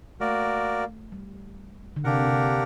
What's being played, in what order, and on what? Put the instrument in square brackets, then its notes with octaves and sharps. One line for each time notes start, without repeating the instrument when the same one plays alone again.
[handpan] A3 [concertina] A#3 F#4 A#4 D5
[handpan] G3
D3
[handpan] C3 [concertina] A#3 D4 G4 A#4 F#5
[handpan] C3